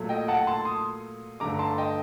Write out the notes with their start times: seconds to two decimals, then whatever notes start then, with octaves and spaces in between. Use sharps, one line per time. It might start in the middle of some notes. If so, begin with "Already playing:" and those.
Already playing: A#2 F#3 A3
0.09 D#5 G5
0.28 F#5 A5
0.47 A5 C6
0.65 C6 D#6
1.40 G2 D3 A3 A#5 D6
1.59 A5 C6
1.78 D#5 G5